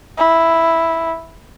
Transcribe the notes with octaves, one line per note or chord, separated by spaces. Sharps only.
E4